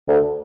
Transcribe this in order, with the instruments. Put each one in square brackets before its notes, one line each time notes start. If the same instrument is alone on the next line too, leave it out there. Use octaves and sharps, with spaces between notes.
[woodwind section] D2